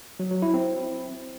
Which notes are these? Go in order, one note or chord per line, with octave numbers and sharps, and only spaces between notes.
F#3
F#3
E4
C4